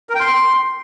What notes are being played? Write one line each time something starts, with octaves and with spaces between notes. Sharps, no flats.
A#4
G5
C6